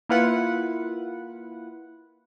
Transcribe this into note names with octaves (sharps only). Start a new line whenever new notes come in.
A#3 E4 F4 B4 F#5